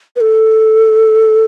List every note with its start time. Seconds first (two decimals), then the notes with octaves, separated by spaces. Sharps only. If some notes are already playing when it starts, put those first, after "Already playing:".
0.16 B4
0.21 A4